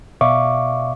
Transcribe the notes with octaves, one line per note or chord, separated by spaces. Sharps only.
B2 D5 E5 F5 C#6 D6